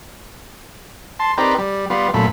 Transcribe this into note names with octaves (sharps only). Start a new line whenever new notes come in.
A5 C6
C4 D#4 G4 A#4 B4 D5
G3
G3 B3 F4
F#2 A#2 A3 B5